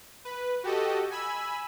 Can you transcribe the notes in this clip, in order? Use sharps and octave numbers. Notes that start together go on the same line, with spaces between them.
B4
F#4 G4 A4 D#5
G#5 B5 E6